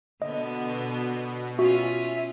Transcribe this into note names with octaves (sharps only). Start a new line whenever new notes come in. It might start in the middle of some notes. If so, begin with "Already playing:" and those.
B2 D3 B3 D#5
C#4 F4 F#4 E5